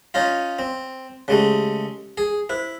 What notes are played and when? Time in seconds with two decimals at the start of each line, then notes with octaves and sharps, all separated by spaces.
0.14 C#4 D#4 F4
0.59 C4
1.28 C#3 G#3 A3 C#4 G4
2.18 G#4
2.50 E4 C5